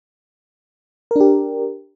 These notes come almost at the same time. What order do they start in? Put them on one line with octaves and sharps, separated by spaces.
A#4 D4 G4